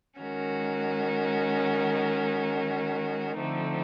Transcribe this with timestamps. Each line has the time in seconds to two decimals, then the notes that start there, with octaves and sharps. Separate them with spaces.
0.19 D#3 G#3 C#4 F#4 A#4
3.40 D3 F3 A3 C4 D#4